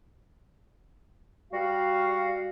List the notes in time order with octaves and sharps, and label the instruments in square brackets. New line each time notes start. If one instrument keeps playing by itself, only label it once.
[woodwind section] G3 F#4 F5